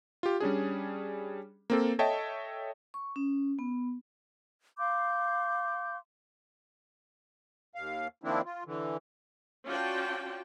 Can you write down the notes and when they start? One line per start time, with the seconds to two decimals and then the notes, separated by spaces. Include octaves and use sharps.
0.23 F4 G4
0.40 G3 C#4 D4 G#4
1.70 A#3 C4 A4
1.99 A4 C#5 D#5 E5 G5 A5
2.94 C#6
3.16 C#4
3.59 B3
4.79 F5 C6 D6 G6
7.75 D#2 F5
8.24 D#3 F3 A#3 C4 D4 E4
8.45 F4
8.66 D3 E3
9.66 C#4 F4 F#4 D5 G5 A5